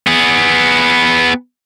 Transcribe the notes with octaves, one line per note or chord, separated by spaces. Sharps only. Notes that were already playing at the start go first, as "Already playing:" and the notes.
B3 G#4